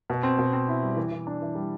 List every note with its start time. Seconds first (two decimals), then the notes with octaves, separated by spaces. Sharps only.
0.10 B2
0.23 C4
0.39 B2
0.53 C4
0.68 E4
0.83 G3
0.97 E3
1.11 E3
1.27 D4
1.42 E3
1.55 G3